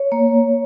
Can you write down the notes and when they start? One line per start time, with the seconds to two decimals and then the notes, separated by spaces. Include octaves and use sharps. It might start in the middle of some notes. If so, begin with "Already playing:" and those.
Already playing: C#5
0.12 A#3